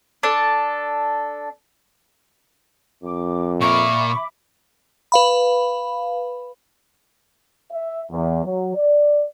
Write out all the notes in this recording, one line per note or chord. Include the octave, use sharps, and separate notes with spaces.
D4 A4
F2 D6
A#2 A#4 E5 B5 C#6 D6
B4 F5 B5
E5
E2
F#3
D5